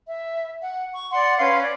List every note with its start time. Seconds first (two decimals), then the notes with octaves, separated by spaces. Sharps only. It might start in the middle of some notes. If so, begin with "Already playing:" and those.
0.07 E5
0.61 F#5
0.93 C#6
1.12 D5 F#5 C6
1.38 C#4 B4 F5 C6
1.62 D5